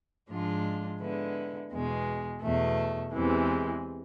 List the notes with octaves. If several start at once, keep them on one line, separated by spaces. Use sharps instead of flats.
G#2 F3 G#3 D4 F4
D3 G#3 B3 E4
E2 B2 G#3
E2 B2 A3
E2 C3 E3 G#3